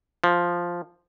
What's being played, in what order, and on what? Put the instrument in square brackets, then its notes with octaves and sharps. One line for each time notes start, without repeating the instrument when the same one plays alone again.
[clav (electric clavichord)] F3